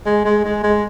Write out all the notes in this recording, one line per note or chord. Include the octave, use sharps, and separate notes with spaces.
G#3
G#3
G#3
G#3